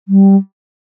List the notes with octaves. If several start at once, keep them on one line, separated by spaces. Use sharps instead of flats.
G3